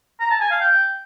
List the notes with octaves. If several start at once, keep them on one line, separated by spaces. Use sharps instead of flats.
A#5
A5
G#5
F5
G5